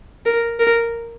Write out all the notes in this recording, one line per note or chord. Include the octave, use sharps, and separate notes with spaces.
A#4
A#4